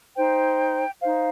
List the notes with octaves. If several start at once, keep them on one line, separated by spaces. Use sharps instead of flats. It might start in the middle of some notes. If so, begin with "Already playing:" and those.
D#4 C5 G5
D#4 C5 F5